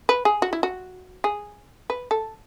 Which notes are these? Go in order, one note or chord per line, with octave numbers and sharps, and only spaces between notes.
B4
G#4
F#4
E4
F#4
G#4
B4
A4